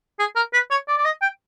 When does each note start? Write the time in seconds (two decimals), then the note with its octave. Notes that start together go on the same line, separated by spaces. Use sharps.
0.19 G#4
0.36 A#4
0.53 B4
0.70 C#5
0.88 D5
0.98 D5
1.05 D#5
1.22 G5